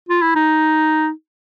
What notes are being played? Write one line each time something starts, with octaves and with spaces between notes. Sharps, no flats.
F4
E4
D#4